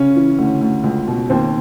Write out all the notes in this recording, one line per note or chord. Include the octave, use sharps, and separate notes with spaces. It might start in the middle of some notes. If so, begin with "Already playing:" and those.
Already playing: C#3 C#4
E3
D2
D2
C#2
B2
D#2 C4